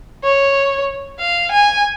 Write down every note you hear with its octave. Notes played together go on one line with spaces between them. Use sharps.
C#5
F5
G#5